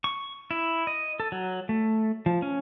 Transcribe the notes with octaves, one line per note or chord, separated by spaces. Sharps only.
C#6
E4
D#5
A4
F#3
A3
F3
C#4